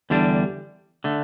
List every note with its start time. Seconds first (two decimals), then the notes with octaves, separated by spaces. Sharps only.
0.10 E2 D3 G3 D4
1.04 D3 A3